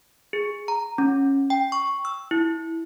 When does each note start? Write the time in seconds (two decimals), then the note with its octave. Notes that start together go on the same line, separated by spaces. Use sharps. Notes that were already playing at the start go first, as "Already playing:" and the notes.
0.33 G#4
0.68 A#5
0.98 C#4
1.50 G5
1.72 C#6
2.05 E6
2.31 E4